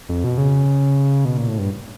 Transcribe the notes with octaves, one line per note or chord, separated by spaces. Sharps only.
F2
B2
C#3
B2
A#2
A2
G2